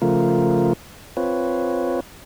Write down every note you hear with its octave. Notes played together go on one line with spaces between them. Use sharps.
C#3 F3 A3 F4 A#4
C4 F4 B4 C#5